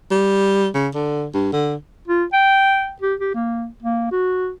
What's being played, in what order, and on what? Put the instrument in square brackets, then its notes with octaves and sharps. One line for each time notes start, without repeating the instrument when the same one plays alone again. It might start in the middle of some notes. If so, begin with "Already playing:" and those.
[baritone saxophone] G3
C#3
D3
G2
D3
[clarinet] F4
G5
G4
G4
A#3
A#3
F#4